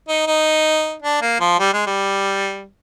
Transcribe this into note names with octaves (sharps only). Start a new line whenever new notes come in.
D#4
D#4
D4
A#3
F3
G3
G#3
G3